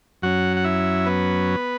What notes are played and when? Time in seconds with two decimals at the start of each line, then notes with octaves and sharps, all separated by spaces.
0.22 F#2 F#3 C#4 F#4 F#5
0.57 F#5
0.64 E4 E5
1.06 B3 B4